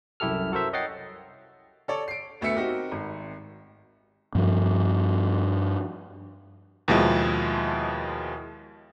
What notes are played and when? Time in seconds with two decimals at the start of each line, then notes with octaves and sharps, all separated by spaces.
0.20 C2 F#2 E4 G4 A4 F6
0.52 F#4 A4 A#4 C5 E5
0.73 C#5 D#5 F#5 G5 A6 C7
1.88 A4 C#5 D5
2.08 C7 D7
2.41 D2 A3 B3 E5 C#7
2.55 C4 D#4 F#4 G4 A#4
2.91 G#1
4.35 G2 F3
6.88 D#2 B2 F3 G#3 E4